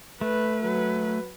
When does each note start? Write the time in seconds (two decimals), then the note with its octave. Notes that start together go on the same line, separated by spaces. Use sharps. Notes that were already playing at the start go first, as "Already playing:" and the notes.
0.21 A3 B4
0.62 F#3 B4